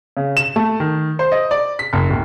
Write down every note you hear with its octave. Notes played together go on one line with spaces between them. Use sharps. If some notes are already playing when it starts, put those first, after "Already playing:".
C#3
E7
A3
D#3
C5
D#5
D5
B6
F#1
D1